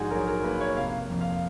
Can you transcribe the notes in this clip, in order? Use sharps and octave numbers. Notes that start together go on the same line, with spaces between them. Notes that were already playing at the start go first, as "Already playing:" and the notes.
Already playing: A#1 G#2 F#4 G#4
F#3 A#4
A#4
A#3 B4
C#5
F1 F5
F2
F5